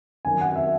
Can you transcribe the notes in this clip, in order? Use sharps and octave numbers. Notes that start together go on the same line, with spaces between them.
F#2 D#3 F#3 G#5
F#5
E5